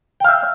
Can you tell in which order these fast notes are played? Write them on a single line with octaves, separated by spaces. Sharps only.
G5 F5 E5